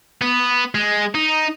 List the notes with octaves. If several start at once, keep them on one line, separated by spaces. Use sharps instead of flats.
B3
G#3
D#4